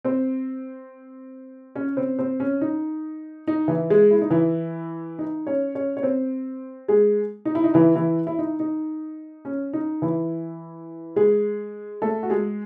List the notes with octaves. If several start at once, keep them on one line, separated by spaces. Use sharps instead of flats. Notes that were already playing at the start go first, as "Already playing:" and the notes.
C4 C5
C#4 C#5
C4 C5
C4 C5
C#4
D#4
D#4
E3 E4
G#3 G#4
E4
D#4
E3 E4
D#4
C#4 C#5
C#4 C#5
C#5
C4 C5
G#3 G#4
D#4
E4
D#4
E3 E4
E3 E4
E4
D#4
D#4
C#4
D#4
E3 E4
G#3 G#4
A3 A4
F#4
G#3 G#4